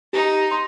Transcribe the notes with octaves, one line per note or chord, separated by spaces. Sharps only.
D#4 G4
C6